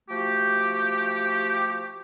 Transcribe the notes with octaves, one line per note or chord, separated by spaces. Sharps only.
F3 A3 F#4 G4